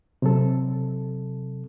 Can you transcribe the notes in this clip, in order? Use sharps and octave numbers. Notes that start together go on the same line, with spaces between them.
C3 F#3 A4